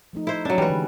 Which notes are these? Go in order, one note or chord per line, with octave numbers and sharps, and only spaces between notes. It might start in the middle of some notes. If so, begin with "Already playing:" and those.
F3 A3 D#4
E4 C5
F3 F#3 C#4 D4
E3 G3 G#3 F#4 B4
D3